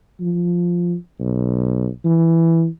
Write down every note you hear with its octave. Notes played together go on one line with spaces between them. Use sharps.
F3
B1
E3